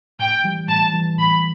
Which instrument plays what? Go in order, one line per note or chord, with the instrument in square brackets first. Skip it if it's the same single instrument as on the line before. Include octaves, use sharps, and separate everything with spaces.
[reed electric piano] A2 [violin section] G5
[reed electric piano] E3 G3
[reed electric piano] A2 [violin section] A5
[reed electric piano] E3 G3
[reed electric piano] A2 [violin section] B5